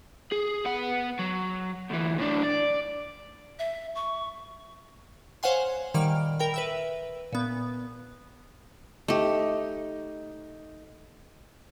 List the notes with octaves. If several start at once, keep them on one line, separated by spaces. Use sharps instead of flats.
G#4
B3 F#5
F#3
D2 E3
A2 D4
D5
E5
C#6
C5 C#5 F5 F#5 G#5 C6
A#2 D#3 G3 F6 D7
A#4 G5 B5
B4 E5 E6
A#2 B3
A3 D#4 G4